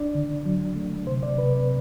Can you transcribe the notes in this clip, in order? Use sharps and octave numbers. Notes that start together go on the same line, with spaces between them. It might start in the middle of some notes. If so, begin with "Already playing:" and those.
Already playing: D4 D5
D3
F#3
A3
C3 C5
D5
C3 B4